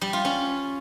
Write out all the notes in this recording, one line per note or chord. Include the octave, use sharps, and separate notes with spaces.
G3
F4
C#4